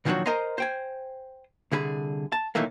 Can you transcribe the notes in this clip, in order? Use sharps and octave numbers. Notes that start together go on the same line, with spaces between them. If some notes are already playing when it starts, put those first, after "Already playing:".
A#2 D#3 F3 F#3 D4 F#4
A#4 C5 D#5 G#5 A#5 C6
C5 G5 G#5
C2 D3 G#4 B5
A5
B1 A#2 D#3 E3 A3 A#3